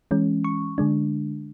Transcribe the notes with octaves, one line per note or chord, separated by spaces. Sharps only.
E3 G#3 C#4
C#6
D3 G#3 D4